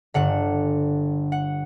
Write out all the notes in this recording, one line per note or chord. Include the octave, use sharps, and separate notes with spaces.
G1 G2 D3 F#5
F#5